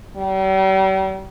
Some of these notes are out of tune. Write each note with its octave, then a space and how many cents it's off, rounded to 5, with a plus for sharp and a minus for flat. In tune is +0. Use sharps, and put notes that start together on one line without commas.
G3 -40